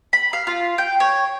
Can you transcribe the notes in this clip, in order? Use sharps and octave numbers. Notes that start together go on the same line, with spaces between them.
B5
F5
F4
G5
C#5